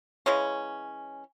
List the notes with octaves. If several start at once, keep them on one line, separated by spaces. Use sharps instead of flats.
C#3 E3 G#3 C#4